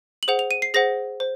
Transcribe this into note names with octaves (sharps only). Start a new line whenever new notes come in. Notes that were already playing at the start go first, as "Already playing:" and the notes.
F#7
G#4 C5 F#5 F7
F7
D#7
C7
G#4 C5 F#5 A#6
C5